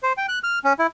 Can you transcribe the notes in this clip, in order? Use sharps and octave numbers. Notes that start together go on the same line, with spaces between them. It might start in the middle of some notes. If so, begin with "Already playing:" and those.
C5
G5
F#6
F6
C#4
E4